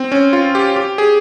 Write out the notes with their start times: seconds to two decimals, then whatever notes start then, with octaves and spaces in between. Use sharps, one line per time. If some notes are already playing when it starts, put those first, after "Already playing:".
Already playing: C4
0.12 C#4
0.33 F4
0.55 G4
0.76 G4
0.98 G#4